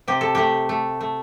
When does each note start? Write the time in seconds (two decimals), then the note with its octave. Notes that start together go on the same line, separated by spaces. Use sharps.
0.08 C3 G4
0.21 A4
0.35 A3 G4
0.69 A3
1.01 A3